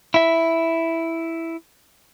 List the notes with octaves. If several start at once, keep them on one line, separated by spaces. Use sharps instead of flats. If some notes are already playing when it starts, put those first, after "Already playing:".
E4 E5